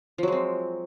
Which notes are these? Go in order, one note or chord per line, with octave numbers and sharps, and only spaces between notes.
F3 F#3 G#3 C4